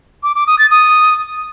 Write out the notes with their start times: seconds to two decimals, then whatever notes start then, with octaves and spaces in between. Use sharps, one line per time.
0.23 D6
0.35 D6
0.47 D#6
0.59 A6
0.70 D#6